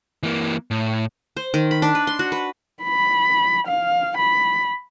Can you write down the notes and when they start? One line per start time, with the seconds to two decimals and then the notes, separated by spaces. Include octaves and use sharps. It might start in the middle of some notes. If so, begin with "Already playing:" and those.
0.23 E3 A#3
0.71 A2
1.37 C5
1.54 D#3
1.71 B5
1.82 D4
1.95 B4
2.07 C6
2.19 F#4
2.32 B4
2.83 B5
3.68 F5
4.18 B5